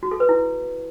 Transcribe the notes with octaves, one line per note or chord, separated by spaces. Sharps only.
F#4
A4
B4
E4